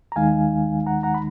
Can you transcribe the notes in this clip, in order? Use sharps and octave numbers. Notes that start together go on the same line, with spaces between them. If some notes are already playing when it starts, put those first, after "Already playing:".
A#5
D#2 D#3 G#3 D#4 F5 G#5
F#5 A#5
F#5 A#5
B5